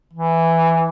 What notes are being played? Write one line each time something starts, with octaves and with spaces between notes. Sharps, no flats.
E3